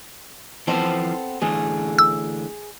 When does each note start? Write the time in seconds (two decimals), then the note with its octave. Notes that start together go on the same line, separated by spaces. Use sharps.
0.67 E3 F3 B3 C4 A4 C5
1.42 D3 E3 A3 G#4
1.99 E6